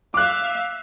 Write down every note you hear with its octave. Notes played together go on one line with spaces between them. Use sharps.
E5 F5 D6 F#6